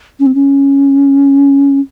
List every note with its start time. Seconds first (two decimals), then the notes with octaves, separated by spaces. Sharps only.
0.19 C#4
0.26 C4
0.35 C#4